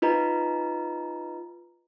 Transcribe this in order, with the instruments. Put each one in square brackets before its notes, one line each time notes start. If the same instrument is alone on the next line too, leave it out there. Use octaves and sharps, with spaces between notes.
[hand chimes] D#4 F4 B4 D#5 A#5